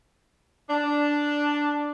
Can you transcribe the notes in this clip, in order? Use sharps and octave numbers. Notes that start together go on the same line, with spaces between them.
D4